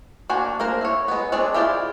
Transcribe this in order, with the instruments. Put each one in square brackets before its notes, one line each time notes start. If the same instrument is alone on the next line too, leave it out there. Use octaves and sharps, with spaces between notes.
[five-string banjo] A#3 D4 F#4 C5 G#5
A#3 D4 A#4 C5
E4 C#5
G#3 B3
G#3 C4 D4 G#4 D5
E4 F4 G4 G#4 D5